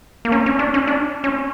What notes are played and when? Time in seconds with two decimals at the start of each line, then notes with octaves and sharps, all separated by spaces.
0.25 A#3
0.32 C#4
0.46 C#4
0.59 D4
0.74 C#4
0.87 D4
1.24 C#4